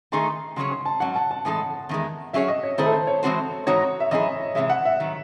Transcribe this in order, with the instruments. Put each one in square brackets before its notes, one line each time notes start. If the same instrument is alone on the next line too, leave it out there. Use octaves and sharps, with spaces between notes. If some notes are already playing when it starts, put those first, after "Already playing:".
[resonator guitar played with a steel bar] D#3 A3 D#4 G#4 [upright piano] C6
[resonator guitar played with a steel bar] C#3 F#3 C#4 G#4 C#5 [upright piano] C6
[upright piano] C6
A5
[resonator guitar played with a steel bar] G#2 F#3 C#4 [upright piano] F#5
[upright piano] A5
A5
[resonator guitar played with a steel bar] A2 E3 G#3 D#4 A4 [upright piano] A5
[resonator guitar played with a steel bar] E2 D#3 G#3
[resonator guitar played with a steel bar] F#3 C#4 G#4 C#5 [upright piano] E5
[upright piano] D#5
C#5
[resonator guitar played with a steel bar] D#3 A3 C4 E4 G#4 [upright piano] C5
[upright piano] A4
C5
C#5
[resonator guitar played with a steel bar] E3 G#3 C4 F#4 C5
[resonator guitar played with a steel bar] G#2 E3 C4 D#4 F#4 [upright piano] C#5
[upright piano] E5
[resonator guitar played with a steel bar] F#2 E3 C4 E4 G#4 [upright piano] D#5
[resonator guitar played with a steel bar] C3 E3 G#3 [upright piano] E5
[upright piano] F#5
E5
[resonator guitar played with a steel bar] D#3 F#3